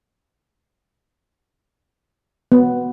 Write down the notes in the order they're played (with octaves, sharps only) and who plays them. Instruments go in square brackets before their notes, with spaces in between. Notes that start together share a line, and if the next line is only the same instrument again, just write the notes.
[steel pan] B3